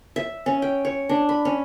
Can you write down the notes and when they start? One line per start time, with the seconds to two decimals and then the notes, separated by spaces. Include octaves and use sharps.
0.16 E5
0.46 C#4
0.62 G5
0.85 C#5
1.09 D4
1.29 B5
1.45 C#4